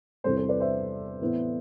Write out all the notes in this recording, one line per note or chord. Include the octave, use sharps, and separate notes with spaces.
E2 C3 G3 C4 A4 C5
A4 C5
B4 D5
C5 E5
A2 E3 B3